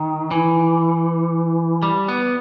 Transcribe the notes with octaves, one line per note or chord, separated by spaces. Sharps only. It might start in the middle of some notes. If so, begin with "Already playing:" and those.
Already playing: D#3
E3
G3
B3